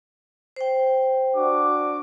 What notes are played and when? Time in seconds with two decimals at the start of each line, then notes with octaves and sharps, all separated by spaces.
0.56 C5 G5
1.35 D4 F#4 D6